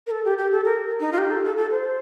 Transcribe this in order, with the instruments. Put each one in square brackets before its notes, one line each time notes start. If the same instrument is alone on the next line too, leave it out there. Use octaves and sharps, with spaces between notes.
[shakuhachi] A#4
A4
G4
G4
A4
A#4
D#4
F4
G4
A4
A4
A4
C5